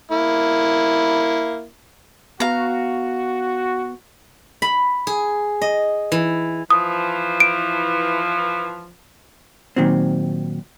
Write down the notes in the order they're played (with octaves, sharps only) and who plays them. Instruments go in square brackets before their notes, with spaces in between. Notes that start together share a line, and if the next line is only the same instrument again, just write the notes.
[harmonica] A#3 E4
[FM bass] B3 [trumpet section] F#4 [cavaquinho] F5 A#5
[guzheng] B5
G#4
D#5
E3
[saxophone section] E3 F3 [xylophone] D#6
[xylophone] D7
[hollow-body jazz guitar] A#2 D#3 F#3 C4